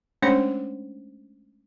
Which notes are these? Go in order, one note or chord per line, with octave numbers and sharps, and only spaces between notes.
G#3 A3 C#4 D4 C5 C#5